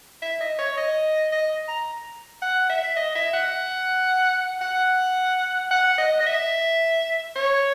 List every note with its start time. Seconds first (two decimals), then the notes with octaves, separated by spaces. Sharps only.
0.22 E5
0.41 D#5
0.58 C#5
0.77 D#5
1.32 D#5
1.68 A#5
2.42 F#5
2.69 E5
2.96 D#5
3.15 E5
3.33 F#5
4.61 F#5
5.71 F#5
5.98 D#5
6.20 D#5
6.26 E5
7.35 C#5